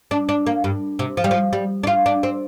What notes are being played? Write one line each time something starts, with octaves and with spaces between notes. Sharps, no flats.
D4
D4
A#3
G2
C3
F3
G3
F3
G3
D4
F4
D4
C4